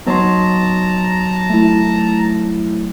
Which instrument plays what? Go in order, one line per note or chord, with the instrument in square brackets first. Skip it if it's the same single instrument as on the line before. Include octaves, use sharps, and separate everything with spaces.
[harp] F#3 D#4 [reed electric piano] B3 C6 [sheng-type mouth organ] A5 A#5
[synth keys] A3 E4